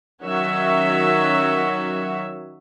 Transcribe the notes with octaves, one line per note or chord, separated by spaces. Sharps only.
D#3 F#3 C#4 F#4 C#5 E5